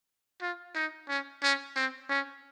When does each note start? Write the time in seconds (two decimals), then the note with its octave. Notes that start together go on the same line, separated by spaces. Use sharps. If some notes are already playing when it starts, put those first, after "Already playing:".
0.41 F4
0.75 D#4
1.09 C#4
1.43 C#4
1.76 C4
2.09 C#4